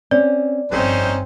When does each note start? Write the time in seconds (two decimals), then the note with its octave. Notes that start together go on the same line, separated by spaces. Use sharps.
0.11 C4 C#4 D5
0.71 G1 F2 C4 C#4 D#4 C5